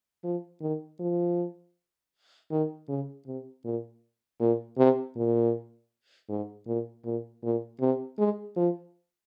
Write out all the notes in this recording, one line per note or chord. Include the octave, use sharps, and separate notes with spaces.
F3
D#3
F3
D#3
C#3
C3
A#2
A#2
C3
A#2
G#2
A#2
A#2
A#2
C3
G#3
F3